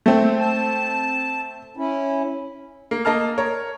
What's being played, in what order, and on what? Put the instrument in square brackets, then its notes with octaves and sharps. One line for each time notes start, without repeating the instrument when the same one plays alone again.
[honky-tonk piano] A3 C4
[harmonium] A5
C#4 E4
[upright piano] A#3
A#3 D#5 A5 F6
A#4 C#5